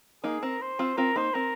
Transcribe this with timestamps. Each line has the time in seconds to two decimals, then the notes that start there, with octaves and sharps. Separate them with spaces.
0.24 A#3 D#4 G#4
0.43 C4 A#4
0.62 C5
0.79 C4 F4
0.97 C4 F4 A#4
1.16 A#3 D#4 C5
1.34 C4 A#4